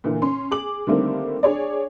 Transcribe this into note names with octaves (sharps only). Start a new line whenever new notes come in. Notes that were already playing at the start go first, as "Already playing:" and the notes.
A#2 D3 E3
C#4 C6
G#4 D6 F#7
D3 D#3 G3 A3 A#3 C4
D4 G#4 C#5 D5